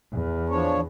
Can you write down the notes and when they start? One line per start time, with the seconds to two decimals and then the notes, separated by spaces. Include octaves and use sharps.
0.13 E2
0.50 F3 D4 C#5